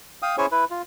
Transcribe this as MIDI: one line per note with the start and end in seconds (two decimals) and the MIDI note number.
0.22 0.36 77
0.22 0.36 79
0.22 0.36 87
0.38 0.46 61
0.38 0.46 64
0.38 0.46 68
0.38 0.46 72
0.38 0.46 73
0.38 0.46 80
0.52 0.65 64
0.52 0.65 71
0.71 0.82 65